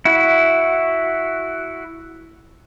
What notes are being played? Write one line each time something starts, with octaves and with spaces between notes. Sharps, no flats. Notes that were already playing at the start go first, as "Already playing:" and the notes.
E4 F#4